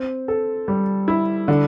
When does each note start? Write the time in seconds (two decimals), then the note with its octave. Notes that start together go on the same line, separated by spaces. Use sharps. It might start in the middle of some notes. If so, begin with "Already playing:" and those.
Already playing: C4
0.28 A4
0.68 G3
1.08 E4
1.48 D3